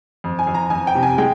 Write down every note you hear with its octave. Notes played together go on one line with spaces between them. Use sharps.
F2
G#5
F2
A#5
F2 G#5
G5
C3
G#5
G#3 G5